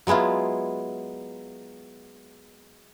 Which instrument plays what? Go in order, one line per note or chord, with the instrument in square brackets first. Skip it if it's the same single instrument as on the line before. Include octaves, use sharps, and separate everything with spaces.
[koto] F#3 G#3 B3 E4 F4